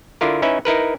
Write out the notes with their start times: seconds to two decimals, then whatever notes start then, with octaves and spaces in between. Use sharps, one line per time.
0.21 D3 E4 F4 A#4
0.42 C#4 D#4 E4 B4 E5
0.65 D#4 E4 A#4 B4